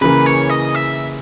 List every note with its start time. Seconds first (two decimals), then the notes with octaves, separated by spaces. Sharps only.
0.01 C#3 E3 A#3 B4
0.26 C#5
0.50 D#5
0.75 E5